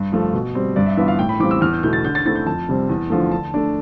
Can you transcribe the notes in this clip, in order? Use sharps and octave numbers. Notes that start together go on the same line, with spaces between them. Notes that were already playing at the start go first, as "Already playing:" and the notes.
Already playing: G2
F3 A3
B2
G3 C4
G2 D5
E5
E3 B3 D4 F4 E5
F5
A2 G5
B5
E3 G3 C4 F4 D6
E6
E2 F6
G6
B2 A3 E4 G6
A6
D3 G6
A6
A3 C4 E4 A6
G6
F2 A5
C3 G3 C4
E2
D3 F3 A3
D3 A5
A3 D4